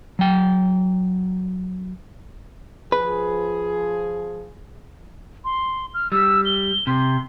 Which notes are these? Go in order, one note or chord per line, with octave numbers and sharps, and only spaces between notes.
F#3 G5
F3 G#4 B4
C6
F6
G3 E6
G7
C3 C6